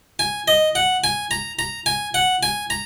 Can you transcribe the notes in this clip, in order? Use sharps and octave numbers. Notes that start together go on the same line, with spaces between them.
G#5
D#5
F#5
G#5
A#5
A#5
G#5
F#5
G#5
A#5